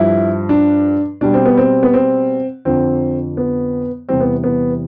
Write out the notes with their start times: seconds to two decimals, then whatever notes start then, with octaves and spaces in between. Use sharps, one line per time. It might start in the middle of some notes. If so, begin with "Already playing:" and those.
Already playing: G2 F3 E4
0.49 D4
1.21 B2 G3 D4
1.34 C4
1.46 B3
1.57 C4
1.83 B3
1.94 C4
2.65 F2 D3 F3 C4
3.37 B3
4.09 E2 C3 E3 G3 C4
4.21 B3
4.44 B3